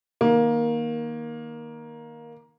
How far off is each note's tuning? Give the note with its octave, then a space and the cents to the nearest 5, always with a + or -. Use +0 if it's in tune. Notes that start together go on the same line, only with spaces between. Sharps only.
D#3 +0 A#3 +15